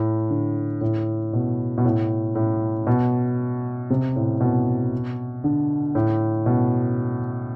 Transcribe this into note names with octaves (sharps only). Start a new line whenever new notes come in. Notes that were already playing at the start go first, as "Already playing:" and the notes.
Already playing: A2
D3
A2
B2
B2
A2
A2
B2
C3
A2
B2
D3
A2
B2